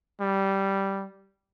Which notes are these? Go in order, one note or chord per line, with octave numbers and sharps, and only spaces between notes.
G3